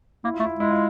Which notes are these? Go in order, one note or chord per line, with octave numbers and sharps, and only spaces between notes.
A#3 E4
F4
A3
E4
G#3 E4
F4